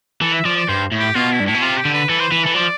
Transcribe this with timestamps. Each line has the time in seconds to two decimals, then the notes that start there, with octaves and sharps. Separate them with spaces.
0.21 E3 A4
0.33 E5
0.45 F3 D5
0.57 D5
0.68 G2 C5
0.92 A2
0.99 G4
1.15 B2 F4
1.31 E4
1.40 G2
1.46 A2 E4
1.55 B2
1.62 C3 F4
1.78 G4
1.85 D3
1.94 B4
2.09 E3 A4
2.20 C5
2.31 E3 B4
2.44 E3 A4
2.55 F3 D5